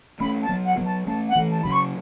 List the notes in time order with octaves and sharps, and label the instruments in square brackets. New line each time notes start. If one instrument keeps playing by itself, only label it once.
[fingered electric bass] A3 C#4 [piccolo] B5
[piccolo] A5
[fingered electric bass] F#3 B3
[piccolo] F#5
[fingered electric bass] F#3 B3
[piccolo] A5
[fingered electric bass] A3 C#4 [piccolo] A5
[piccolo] F#5
[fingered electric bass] E3 A3
[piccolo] A5
[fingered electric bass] C#3 F#3 [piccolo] B5
[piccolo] C#6